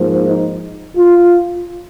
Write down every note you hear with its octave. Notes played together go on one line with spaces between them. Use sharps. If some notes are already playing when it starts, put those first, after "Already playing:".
Already playing: G#2 F3 A#3
D#4
F4